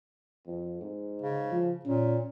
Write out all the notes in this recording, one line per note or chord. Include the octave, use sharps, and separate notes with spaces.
F2
G#2
C#3
F3
A#2 C#4